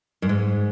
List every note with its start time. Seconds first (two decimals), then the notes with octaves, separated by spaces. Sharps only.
0.22 F#2
0.29 G#2